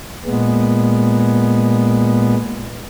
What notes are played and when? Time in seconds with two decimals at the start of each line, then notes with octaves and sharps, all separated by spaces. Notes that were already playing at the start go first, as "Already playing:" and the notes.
0.25 A#2 G#3 B3